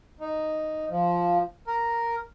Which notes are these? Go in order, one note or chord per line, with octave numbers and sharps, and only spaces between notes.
D#4
F3
A#4